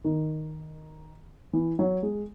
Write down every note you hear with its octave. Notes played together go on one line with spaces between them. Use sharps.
D#3
E3
F#3
G#3